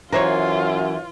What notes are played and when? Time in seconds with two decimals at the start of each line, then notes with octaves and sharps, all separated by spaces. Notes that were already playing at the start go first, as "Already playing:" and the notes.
0.12 F#2 E3 F4 A#4 C5 C#5